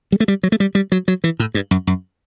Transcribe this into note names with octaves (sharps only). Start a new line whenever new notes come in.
G3
A3
G3
F#3
A3
G3
G3
F#3
F#3
E3
A2
G2
F#2
F#2